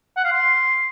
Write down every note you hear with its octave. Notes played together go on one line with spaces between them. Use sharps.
F#5
F5
C6